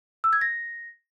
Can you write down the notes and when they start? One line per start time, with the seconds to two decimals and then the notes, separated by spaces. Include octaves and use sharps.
0.24 E6
0.33 G#6
0.41 A#6